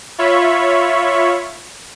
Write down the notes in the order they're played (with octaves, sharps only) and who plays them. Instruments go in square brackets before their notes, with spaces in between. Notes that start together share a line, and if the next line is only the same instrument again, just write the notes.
[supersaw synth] F4 C#5 E5 B5 C#6